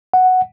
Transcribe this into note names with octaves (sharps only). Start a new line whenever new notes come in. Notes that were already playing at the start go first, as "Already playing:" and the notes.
F#5